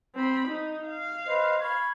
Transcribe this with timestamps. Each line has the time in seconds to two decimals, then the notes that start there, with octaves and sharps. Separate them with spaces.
0.15 C4 B5
0.48 D#4
0.87 F5
1.25 B4 C5 D#5
1.59 B5 C#6 G#6